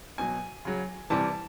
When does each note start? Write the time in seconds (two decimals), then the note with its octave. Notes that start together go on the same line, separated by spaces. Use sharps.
0.18 B2 F#3 G#5
0.65 C#3 F#3
1.10 C3 E3 G3 A5